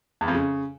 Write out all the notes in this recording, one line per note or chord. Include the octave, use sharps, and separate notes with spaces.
E2
F2
C#3